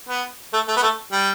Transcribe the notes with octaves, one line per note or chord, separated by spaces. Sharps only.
B3
A3
A3
B3
A3
G3